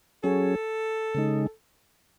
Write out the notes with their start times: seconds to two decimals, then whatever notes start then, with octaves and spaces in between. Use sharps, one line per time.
0.24 F#3 C#4 G#4 A4
1.15 C#3 G#3 D#4